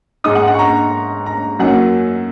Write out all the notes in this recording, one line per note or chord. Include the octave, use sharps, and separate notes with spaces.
G#2 G#3 D#4 D#6
F#5
F#5
C#6
A#5
A#5
F#2 F#3 A#3 D#4 F#5